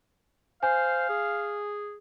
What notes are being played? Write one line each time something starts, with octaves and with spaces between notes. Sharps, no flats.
C5 F5 G#5
G#4